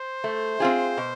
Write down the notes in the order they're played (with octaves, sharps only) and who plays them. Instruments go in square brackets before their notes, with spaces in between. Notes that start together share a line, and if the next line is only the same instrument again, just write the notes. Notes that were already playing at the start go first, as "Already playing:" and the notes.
Already playing: [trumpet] C5
[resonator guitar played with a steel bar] A3
C4 F4 G#4
B2